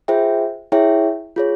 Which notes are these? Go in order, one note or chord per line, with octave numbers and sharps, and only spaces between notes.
F4 G#4 C5 E5 G5
E4 G#4 C#5 E5 G5
F4 G#4 C#5